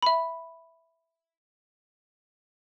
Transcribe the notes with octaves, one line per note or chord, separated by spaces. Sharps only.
E5 B5